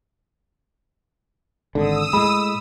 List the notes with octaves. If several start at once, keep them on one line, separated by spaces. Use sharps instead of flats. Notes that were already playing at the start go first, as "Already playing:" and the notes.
G#1 D3 D#6 E6
A2 G#3 B5